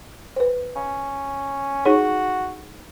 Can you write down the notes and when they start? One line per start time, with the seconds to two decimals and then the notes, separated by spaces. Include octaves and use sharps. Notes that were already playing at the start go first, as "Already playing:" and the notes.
0.36 B4 C5
0.76 C#4
1.85 D#4 F#4 G#4 C#5